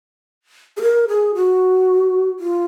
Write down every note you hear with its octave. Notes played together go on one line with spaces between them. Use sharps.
G#4
A#4
G#4
F#4
F4